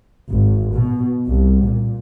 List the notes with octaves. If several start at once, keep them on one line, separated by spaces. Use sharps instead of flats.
G#1
B2
C2
A#2